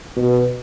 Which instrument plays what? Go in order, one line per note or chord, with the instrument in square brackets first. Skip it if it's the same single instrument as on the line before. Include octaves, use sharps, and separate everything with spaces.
[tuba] B2